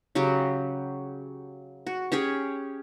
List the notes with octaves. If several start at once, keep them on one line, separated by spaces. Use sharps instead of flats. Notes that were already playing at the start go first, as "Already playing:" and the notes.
C#3 F#3 F#4 G4
F#4
C#4 G4 G#4 C#5